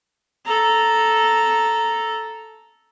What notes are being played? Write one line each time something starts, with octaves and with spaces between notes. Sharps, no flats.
A4 A#5